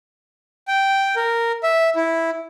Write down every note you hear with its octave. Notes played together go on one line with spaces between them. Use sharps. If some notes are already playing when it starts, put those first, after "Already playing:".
G5
A#4
E5
E4